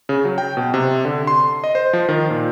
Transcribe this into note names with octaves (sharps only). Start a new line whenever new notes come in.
C#3
F#3
G5
B2
C3
D3
C6
D#5
C5
F3
D#3
A#2